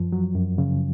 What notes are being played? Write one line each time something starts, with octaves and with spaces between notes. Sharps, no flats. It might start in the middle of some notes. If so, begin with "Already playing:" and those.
Already playing: F#2 F3
F#3
F#2
C#3